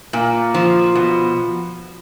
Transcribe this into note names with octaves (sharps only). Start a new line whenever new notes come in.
A#2
F3
B2